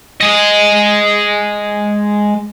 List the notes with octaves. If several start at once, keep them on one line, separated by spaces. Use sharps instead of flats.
G#3 D#5